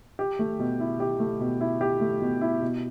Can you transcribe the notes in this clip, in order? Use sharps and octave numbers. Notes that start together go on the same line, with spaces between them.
G4
A3
B2
E4
G4
A3
B2
E4
G4
A3
B2
E4
B2